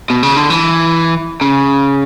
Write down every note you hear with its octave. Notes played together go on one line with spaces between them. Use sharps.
B2
C#3
D3
E3
C#3